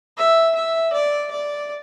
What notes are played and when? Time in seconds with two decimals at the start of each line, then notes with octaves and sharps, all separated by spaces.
0.17 E5
0.55 E5
0.93 D5
1.31 D5